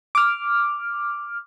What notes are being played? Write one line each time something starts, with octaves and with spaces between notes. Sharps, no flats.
D6 F6